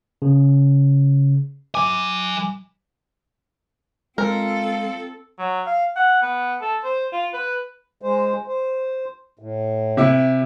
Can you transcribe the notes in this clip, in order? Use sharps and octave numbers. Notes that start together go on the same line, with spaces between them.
C#3
F#3 G#5 D6
G#3 C4 F4 A4 A#4
F#3
F5
F#5
B3
A4
C5
F4
B4
G#3 C5
C5
A2
C3 E4